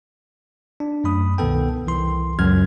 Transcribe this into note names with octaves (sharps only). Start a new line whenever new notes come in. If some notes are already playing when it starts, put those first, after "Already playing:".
D4
F#2 A3 B5 D#6
C2 B2 D#3 B3 A4 G5
C2 E3 C6
C#2 F#2 F#3 C#4 F6 G#6